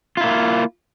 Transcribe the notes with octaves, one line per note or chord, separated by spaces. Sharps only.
A#3 E4 F4